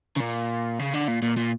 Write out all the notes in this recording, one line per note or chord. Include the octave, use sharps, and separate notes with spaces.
C#3
A#2
C#3
D3
A#2
A#2
A#2